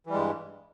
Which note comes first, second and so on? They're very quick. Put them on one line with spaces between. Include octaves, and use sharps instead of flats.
E3 G3 G#3 G2